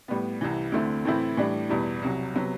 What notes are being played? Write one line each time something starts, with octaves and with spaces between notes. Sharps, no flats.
A2 G3 B3
C2 C3 E3
D2 D3 A3 C4 E4
A2 E3 A3 C4 E4
A2 E3 G3 D4
E2 B2 G3 B3 E4
C2 C3 F#3
C3 F#3 B3